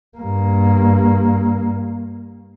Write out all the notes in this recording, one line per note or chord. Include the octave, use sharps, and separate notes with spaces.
G2 A#3